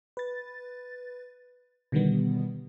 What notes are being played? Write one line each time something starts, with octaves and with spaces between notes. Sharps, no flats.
B4 A6
B2 D3 D#3 G3 B3